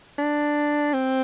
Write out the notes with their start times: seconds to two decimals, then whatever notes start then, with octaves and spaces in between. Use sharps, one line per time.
0.19 D4
0.94 C4